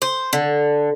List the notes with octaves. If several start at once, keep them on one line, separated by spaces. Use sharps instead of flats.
C5
D3